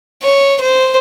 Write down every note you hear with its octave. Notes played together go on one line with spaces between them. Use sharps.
C#5
C5